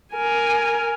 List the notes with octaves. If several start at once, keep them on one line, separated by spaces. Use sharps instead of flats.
A#4 G#5